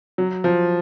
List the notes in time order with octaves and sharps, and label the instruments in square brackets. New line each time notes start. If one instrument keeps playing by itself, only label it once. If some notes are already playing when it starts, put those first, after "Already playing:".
[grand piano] F#3
F3